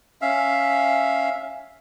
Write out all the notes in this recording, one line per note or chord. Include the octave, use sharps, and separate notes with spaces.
C#4 E5 F5